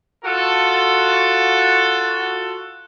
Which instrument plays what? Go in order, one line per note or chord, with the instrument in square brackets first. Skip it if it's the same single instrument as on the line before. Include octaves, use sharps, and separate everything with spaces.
[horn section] F4 F#4 A4